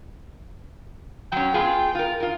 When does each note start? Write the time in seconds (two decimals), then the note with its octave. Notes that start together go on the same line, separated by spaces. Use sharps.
1.32 F#3 C#4 G5
1.54 B3 F4 G#4
1.95 F4 A#4
2.20 F4 A#4